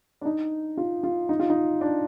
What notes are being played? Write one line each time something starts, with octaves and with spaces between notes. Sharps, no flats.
D4
D#4
F4
F4
D#4
F4
D#4
D4